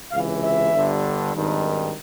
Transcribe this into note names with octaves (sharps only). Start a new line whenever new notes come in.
C#2 C3 E3 F5
E5
G1 G2 D3
G#1 G2 D#3